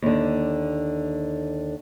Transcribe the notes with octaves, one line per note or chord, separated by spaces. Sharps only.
D#2 D3